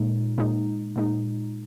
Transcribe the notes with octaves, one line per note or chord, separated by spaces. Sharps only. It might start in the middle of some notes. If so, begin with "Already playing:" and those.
Already playing: A#2 G#3 D#4
A#2 G#3 D#4
A#2 G#3 D#4